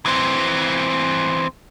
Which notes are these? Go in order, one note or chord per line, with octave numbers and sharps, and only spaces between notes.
E3 C4